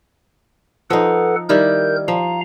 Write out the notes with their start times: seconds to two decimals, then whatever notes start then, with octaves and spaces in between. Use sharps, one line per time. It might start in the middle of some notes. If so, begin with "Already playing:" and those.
0.90 F3 D#4 A4 B4 F#5
1.49 D#3 G3 E4 A#4 G6
2.08 F3 F5 A#5